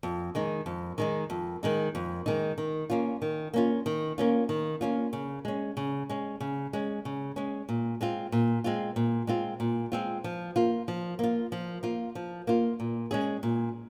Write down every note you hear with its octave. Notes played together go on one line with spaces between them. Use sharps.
F2
D#3 G#3 D#4
F2
D#3 G#3 D#4
F2
D#3 G#3 D#4
F2
D#3 G#3 D#4
D#3
A#3 C#4 F4
D#3
A#3 C#4 F4
D#3
A#3 C#4 F4
D#3
A#3 C#4 F4
C#3
G#3 C#4
C#3
G#3 C#4
C#3
G#3 C#4
C#3
G#3 C#4
A#2
G#3 C4 F4
A#2
G#3 C4 F4
A#2
G#3 C4 F4
A#2
G#3 C4 F4
F3
A#3 F4
F3
A#3 F4
F3
A#3 F4
F3
A#3 F4
A#2
G#3 C#4 G#4
A#2